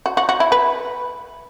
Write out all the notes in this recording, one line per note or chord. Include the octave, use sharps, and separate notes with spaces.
F#4
F#4
F#4
E4
B4